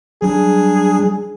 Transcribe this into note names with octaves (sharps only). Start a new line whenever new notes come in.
F#3 G3 D4 G#4